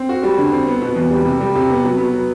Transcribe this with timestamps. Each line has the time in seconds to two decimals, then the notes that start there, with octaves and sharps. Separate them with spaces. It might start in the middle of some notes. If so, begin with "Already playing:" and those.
Already playing: C4
0.09 F#4
0.23 G3
0.38 D3
0.53 C4
0.67 B3
0.82 B2
0.96 E2
1.11 G3
1.25 C3
1.41 G3
1.55 C3
1.70 B3
1.84 F#3
1.98 B3
2.14 F#3